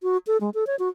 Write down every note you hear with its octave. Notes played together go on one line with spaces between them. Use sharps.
F#4
A4
G#3
A4
C#5
F#4